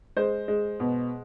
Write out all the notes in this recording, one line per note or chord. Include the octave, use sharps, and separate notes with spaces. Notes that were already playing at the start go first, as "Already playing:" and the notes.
G#3 C5
G#3
B2